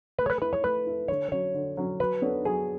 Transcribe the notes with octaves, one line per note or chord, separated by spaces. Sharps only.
A3 B4
C#5
B4
E4 A4 B4
C#5
A3 B4
E4 A4
D3 C#5
F#3 C#4 C#5
D3
F#3 C#4
F#3 B4
B3 D4 A4 C#5
F#3 G#4